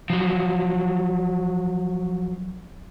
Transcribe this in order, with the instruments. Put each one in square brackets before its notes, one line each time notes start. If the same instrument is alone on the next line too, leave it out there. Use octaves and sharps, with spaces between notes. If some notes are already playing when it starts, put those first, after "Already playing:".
[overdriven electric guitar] F3 F#3